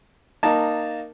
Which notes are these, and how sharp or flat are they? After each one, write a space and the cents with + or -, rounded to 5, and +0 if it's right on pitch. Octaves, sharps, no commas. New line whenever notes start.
A#3 +0 D#4 -15 A5 +0